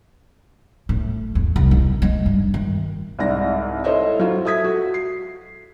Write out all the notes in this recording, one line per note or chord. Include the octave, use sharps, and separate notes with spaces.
A2
E2
C2
D#4
G#3
G2
D#3
C2 G#2 D5 A#6
E4 A4 C5 C#5 D#5 E5
F#3 F4
A4 E5 D#6 G#6 B6
F#4
C7